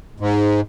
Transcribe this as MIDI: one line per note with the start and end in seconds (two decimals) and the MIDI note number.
0.20 0.61 44